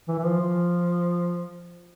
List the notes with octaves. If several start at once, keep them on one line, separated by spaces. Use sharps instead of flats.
E3
E3
F3
F3